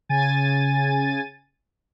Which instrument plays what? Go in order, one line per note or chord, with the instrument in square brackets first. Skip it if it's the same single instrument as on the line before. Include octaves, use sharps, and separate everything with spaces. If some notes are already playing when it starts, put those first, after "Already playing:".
[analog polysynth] C#3 G#5 A6 D#7